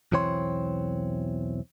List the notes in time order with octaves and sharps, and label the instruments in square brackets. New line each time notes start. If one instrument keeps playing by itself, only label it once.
[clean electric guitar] B1 E2 E3 C4 C#5 C6